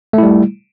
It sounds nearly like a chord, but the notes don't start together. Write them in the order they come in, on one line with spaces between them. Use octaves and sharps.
A3 E4 G3